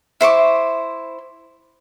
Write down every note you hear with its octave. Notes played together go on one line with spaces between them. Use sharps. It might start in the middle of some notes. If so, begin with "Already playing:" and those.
E4 C5 C#6 D6